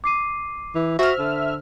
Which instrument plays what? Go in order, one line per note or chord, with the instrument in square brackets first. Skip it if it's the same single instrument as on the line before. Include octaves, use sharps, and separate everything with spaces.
[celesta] D6 C7 D#7
[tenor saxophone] E3
[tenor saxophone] F#4 [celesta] C5 [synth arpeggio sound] E5 F6
[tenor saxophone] D3